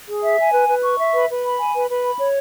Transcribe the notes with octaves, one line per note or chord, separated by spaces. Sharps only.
G#4
E5
G#5
B4
B4
C#6
E5
B4
B4
B5
G#5
B4
B4
B5
C#5